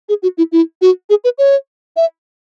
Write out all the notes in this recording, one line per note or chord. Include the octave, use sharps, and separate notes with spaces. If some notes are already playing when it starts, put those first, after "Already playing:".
G#4
F#4
E4
E4
F#4
G#4
B4
C#5
E5